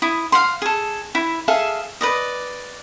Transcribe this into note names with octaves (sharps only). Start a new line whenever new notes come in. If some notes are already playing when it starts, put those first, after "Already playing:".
E4 D#6
F5 F#5 C6
G#4 A4
E4
G#4 A4 E5 F5
B4 D5 D#5